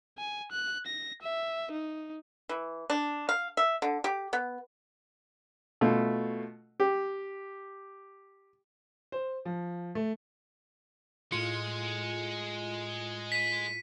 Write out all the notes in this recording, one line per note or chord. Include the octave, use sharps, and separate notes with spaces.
G#5
F#6
A#6
E5
D#4
E3
D4
F5
E5
D3
G4
B3
B2 A3 F4
G4
C5
F3
A3
A2 G#3 F4 C#7
B6 D#7